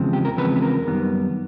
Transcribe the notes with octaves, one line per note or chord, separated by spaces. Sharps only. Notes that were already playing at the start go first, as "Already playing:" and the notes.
Already playing: E2 C#3 F3 G#3 C4
G4
A#4
E2 C#3 F3 G#3 C4 B4
B4
A#4
F#2 D#3 G3 B3